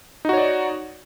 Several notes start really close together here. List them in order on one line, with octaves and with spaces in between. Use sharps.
D#4 F#4 C#5 D5